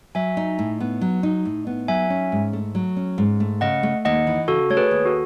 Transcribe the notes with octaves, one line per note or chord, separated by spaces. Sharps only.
F#3 E5 G#5
D#4
A2
B3
F#3
D#4
A2
B3
F#3 E5 G#5
C#4
G#2
A3
F#3
C#4
G#2
A3
C#3 D#5 F#5
A3
D#2 D#5 F#5
E3
C#3 F#4 A4
A3 C#5
G#4 B4
D#2
F#4 A4